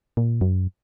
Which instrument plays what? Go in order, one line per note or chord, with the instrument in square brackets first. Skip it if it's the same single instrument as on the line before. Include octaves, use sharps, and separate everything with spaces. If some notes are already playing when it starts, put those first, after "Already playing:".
[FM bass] A#2
F#2